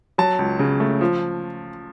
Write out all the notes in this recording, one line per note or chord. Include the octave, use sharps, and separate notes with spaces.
F#3 A5
C#2
C#3
A3
F3